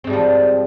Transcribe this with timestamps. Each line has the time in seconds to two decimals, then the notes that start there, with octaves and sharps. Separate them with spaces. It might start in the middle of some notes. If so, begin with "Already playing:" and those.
0.04 C4
0.07 G#2
0.10 G3
0.13 F3